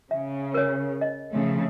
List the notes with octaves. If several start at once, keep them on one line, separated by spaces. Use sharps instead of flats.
C#3 E5
A#4 C#5
D#5
C#3 F3 A3